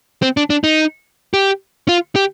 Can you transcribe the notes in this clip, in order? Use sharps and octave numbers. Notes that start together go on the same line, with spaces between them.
C4
D4
D4
D#4
G4
F4
G4